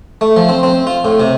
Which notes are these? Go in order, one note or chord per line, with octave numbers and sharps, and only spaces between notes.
A3
F3
C4
C4
F4
A2
C3